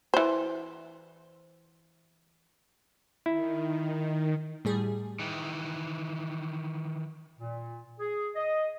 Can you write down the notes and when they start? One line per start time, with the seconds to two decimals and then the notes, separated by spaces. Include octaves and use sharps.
0.14 E3 C5
3.26 D#3 E4
4.65 A2 G3 G#4
5.19 D#3 E3
7.39 A#2
8.00 G#4
8.36 D#5